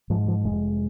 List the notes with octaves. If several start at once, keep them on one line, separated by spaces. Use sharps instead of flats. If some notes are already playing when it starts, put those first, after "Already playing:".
G#2 F3
F3
F1 G#3